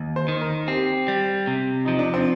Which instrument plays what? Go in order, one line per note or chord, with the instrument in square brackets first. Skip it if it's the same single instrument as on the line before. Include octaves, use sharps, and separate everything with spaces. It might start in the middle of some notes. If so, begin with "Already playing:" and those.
Already playing: [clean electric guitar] D#2
[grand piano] C5
[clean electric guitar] D#3
[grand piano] A#4
[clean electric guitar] C4 [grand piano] G4
[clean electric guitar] G3
C3
[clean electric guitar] F3 [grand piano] D#4
[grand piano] D4
C4